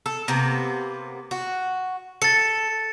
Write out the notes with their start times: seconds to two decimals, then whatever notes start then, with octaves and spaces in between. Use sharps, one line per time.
0.06 A4
0.28 C3 A#3 B3
1.31 F#4
2.22 A4 A6 C#7